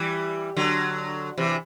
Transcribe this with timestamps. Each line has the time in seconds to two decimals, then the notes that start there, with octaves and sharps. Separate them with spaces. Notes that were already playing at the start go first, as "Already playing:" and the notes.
Already playing: E3 G3
0.56 D3 F#3
1.38 C3 E3